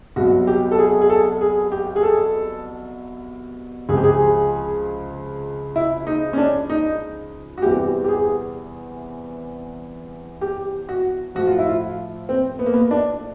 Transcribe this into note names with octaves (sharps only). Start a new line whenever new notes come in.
C2 B2 F#3 F#4
G4
A4
G#4
G#4
A4
G#4
G4
G#4
A4
C#2 C3 F3 G#4
G4
G#4
E4
D#4
C#4
D4
D#4
F#4
E2 C3 E3 G3 G4
G4
G#4
G4
F#4
A2 F3 F#4
F4
E4
F4
C4
B3
A#3
B3
D4